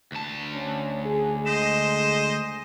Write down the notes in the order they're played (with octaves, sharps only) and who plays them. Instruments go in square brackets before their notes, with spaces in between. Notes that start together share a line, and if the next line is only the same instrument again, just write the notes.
[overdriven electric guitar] D2 A5
[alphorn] C#4
G#4
[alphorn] G#3 [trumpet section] C5 D#5 [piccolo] E7